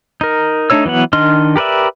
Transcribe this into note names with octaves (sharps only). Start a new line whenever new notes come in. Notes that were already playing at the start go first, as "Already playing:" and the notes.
D#4 A#4
A3 D4 D#4 C#5 E6
E3 F#3 B3 F#5
D#3 D4 D#5 C6 F6
G4 A#4 B4 D5 E5